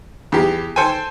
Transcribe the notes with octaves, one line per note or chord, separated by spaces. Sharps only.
E2 G4
A4 C5 G5 G#5